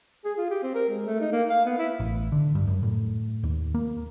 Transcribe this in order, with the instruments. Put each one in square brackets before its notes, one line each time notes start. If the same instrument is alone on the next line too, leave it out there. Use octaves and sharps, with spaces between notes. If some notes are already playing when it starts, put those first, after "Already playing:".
[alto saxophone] G#4
F4
G4
C4
A#4
G#3
A3
D#4
A#3
F5
B3
E4
[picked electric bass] A1
D3
G2
F#2
A2
D#2
A#3